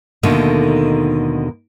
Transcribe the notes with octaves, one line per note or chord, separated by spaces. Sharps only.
D#2 B2 D3 D#3 A3 D#4